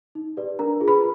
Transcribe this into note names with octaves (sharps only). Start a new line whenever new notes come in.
D#4
G4 B4 D5
D4 A#4 A#5
F4 G#4
B4 B5